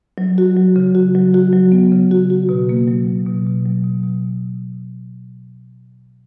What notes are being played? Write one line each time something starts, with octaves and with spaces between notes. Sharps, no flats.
F#3
F#4
F#3
C#3
F#4
F#3
F#4
F#3
B3
C#3
F#4
F#4
B2
A#3
F#3
F#3
B2
B2
F#3
B2
B2